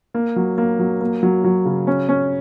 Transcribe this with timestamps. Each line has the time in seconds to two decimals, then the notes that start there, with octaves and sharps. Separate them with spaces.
0.14 A#3
0.36 F#3
0.58 A#3
0.79 F#3
1.01 A#3
1.23 F#3
1.44 F#3
1.66 C#3
1.87 C#4
2.09 C#4